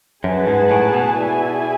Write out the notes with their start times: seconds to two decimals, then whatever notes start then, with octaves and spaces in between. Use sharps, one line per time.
0.24 F#2 G#4 B4 F#5 A5
0.47 G#2
0.71 A2
0.94 B2
1.17 E4 G#4 D5 G#5